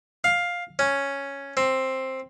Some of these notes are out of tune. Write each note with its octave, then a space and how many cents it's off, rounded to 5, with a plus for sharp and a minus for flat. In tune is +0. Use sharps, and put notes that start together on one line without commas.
F5 +10
C#4 +0
C4 +10